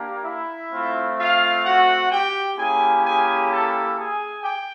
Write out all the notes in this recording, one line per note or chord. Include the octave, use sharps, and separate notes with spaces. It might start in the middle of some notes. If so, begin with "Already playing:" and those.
Already playing: A#3 D4 G4
E4 E5
A3 C4 F4
F4 F5
F#4 F#5
G4 G5
A#3 C#4 E4 G4 G#4 G#5
G#4 G#5
A4 A5
G#4 G#5
G4 G5